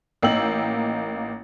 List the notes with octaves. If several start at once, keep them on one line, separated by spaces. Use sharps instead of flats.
A1 A#3 D#4 G5 E6 F#7